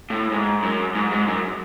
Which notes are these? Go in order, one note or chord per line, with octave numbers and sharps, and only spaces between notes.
A2
G#2
F#2
G#2
G#2
F#2